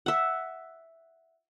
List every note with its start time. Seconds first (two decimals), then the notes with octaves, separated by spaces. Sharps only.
0.06 E5 F#5